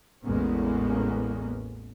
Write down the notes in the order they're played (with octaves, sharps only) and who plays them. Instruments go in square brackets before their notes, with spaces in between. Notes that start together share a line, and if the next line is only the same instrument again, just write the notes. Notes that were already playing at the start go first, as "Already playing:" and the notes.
[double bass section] A1 E2 G#3 A#3 B3 C#4